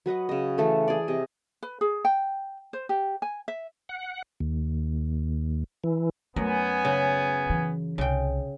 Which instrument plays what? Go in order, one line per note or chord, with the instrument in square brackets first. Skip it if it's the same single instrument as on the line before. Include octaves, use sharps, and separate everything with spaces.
[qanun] F#3 B4 D#5 F#5
C#3 D#5
E3 A3 A4
G#4 D5
C3 D#5
[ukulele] B4
G#4
G5
C5
G4
G#5
E5
[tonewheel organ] F#5
D#2
E3
[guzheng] F#2 [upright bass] A3 [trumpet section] B3 G#5
[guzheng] C#3
[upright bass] E3
[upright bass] C2 [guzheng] C#3 G5